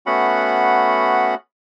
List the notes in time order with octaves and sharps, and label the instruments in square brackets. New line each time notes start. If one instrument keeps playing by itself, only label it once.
[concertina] A3 B3 C#4 F#4 F#5 B5